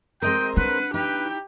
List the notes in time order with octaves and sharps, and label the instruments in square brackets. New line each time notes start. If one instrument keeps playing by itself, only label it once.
[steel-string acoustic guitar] G#3 C4 A#4 [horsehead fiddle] D#5 [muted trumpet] G5
[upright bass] D4 [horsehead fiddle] B4 [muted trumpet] F#5
[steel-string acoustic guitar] D#4 E4 [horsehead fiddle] G4 G5 [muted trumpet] B4